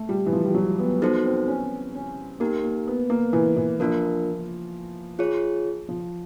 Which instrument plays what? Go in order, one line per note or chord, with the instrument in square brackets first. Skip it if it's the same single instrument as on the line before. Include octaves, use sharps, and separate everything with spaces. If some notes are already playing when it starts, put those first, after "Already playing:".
Already playing: [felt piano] A3
G3
E3
F3
G3
F#3
B3
[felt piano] B3 [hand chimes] D#4 F#4 A4 C5
[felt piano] C4
C#4
C#4
[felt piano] A#3 [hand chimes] D#4 G4 A#4
[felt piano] A#3
B3
A#3
E3
E3
[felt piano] F3 [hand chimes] A#3 D4 F4 A#4
[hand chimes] F4 G#4 C#5
[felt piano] F3